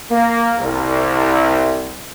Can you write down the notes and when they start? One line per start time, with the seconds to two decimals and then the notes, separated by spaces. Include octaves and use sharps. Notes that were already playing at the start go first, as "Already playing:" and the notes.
0.11 A#3
0.58 C2